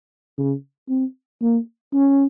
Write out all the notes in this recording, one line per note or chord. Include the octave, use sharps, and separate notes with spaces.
C#3
C4
A#3
C#4